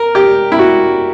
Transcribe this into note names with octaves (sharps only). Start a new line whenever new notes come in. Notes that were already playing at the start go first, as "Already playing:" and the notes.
Already playing: A#4
G4
E4
F#4